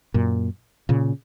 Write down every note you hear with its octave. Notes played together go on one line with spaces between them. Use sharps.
F#2 A#2
A#2 C#3